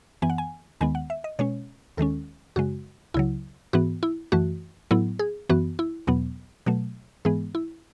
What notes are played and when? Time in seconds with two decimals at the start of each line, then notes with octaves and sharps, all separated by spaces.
0.22 F#2 E3 B3 G#5
0.30 F#5
0.38 G#5
0.81 D#2 D#3 G#3 B3 G#5
0.95 F#5
1.10 E5
1.24 D#5
1.39 B2 G#3 C#4 C#5
1.97 D#2 D#3 G#3 C#4 A4
2.56 F#2 C#3 G#3 F#4
3.14 C#2 C#3 F#3 E4
3.73 G#2 E3 B3 F#4
4.03 E4
4.32 F#2 E3 A3 F#4
4.91 A2 F#3 B3 E4
5.19 G#4
5.49 F#2 E3 B3 F#4
5.79 E4
6.07 E2 B2 F#3 B3
6.66 B2 F#3 A3
7.25 G#2 E3 G#3 B3 G#4
7.55 E4